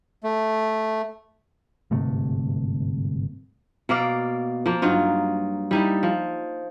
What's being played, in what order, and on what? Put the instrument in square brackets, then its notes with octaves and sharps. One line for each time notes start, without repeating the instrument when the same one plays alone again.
[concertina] A3
[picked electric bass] G1 G#2 C3 A3
[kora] B2 A#3 D5 F5
F3 A#3
G2 F#3 D#4 F4
G3 D#4 E4
F3